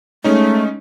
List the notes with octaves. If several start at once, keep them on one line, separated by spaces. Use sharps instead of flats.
G#3 A3 C#4 D#4